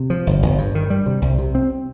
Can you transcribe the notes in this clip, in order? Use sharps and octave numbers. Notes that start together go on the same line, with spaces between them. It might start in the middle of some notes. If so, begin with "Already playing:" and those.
Already playing: C3
F3
G1
G1
G2
D#3
G3
C3
C2
C3
C4